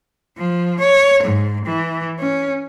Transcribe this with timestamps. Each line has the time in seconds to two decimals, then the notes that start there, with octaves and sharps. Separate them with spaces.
0.38 F3
0.80 C#5
1.23 G#2
1.65 E3
2.19 C#4